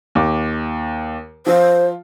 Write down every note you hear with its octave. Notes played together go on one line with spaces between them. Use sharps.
D#2 D6
F3 F4 C5